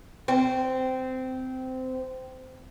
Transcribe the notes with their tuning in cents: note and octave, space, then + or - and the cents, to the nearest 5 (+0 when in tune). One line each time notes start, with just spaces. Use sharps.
C4 -15